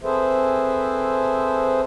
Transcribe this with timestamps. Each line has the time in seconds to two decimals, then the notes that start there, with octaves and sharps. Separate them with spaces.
0.03 C4 G#4 A4 B4 C5 E5